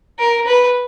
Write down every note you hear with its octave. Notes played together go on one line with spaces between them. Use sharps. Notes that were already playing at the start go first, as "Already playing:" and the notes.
A#4
B4